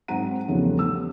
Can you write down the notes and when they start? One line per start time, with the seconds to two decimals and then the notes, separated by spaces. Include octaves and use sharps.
0.08 G#2 F#3 C4 F#5 A#5 D#7
0.48 E2 C#3 F3 G3 A3 B3
0.79 E6